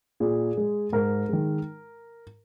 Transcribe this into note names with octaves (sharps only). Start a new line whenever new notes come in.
A#2 G#4
G#3
G#2 A#4
D#3 G#3